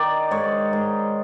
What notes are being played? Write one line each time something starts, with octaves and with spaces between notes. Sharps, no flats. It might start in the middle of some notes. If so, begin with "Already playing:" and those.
Already playing: D#3 D5
G#2 C#5
G#2